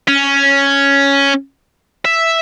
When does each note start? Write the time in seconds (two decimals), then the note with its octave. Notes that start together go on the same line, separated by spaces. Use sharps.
0.08 C#4
2.05 E5